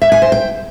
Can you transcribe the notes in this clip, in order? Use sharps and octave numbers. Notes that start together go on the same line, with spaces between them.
E5
G#5
C5
G5